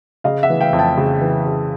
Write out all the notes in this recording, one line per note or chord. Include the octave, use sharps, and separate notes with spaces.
C#3 D#5 F5
E5 F#5
E3
F5 G5
F2
G5 A5
C#3
E3
C#3